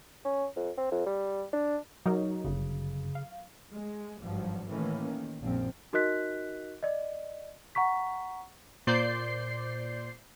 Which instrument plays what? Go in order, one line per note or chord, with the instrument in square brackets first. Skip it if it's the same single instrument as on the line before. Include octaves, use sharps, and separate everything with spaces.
[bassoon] C#4
F2
C4
F2
G3
D4
[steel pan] F#3 [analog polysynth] D#4 A#4
[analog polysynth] G1 F#2 [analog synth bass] C#3
[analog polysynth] F5
[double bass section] G#3
G#1 G2 F3 F#3
A2 D#3 E3 A3 A#3 C#4
D#3
A#1 F#2 F3 C4
[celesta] D#4 F#4 A#4 D#5 F#6 B6
D5 D#5
F#5 A#5 C#6 B6
[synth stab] A#2 C5 D5 G6 C7